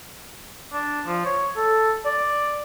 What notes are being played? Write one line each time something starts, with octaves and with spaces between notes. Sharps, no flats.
D4
F3
C#5
A4
D5